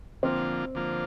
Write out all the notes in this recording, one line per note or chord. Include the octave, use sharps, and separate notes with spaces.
D3 F3 A#3 C4 F4
D3 F3 A#3 F4